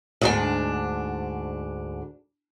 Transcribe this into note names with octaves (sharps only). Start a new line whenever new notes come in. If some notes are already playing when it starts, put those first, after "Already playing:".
D2 G#2 D4